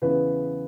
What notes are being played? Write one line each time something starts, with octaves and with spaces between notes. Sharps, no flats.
E2 C#3 E3 B3 B4